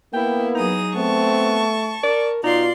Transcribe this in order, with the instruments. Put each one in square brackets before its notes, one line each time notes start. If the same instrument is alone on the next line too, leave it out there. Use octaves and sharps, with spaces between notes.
[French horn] A#3 [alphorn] B3 [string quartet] E4 [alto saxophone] G5
[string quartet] F#3 G#4 D#6 [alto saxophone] D#4
[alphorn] A3 [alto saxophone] B3 [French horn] C4 [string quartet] A5 C#6
[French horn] A#4 [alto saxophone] D5
[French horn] B2 [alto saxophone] D#4 [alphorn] F4 [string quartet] D5 C6